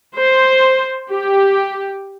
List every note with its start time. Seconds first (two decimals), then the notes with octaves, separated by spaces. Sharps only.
0.16 C5
1.10 G4